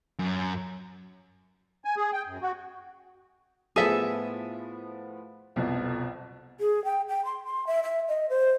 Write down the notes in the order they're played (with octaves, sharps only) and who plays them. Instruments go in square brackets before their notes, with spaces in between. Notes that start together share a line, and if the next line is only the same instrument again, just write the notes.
[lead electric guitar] F#2
[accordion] G#5
G#4
G5
F#2
F#4
[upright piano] A2 F3 B3 [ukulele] G#4 A4 E5
[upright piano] C2 F2 B2
[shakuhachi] G#4
G5
G5
C6
C6
E5
E5
D#5
C5